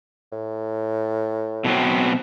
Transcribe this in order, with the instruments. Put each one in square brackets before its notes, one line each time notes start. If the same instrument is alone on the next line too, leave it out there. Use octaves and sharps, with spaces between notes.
[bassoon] A2
[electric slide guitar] B2 F#3 C4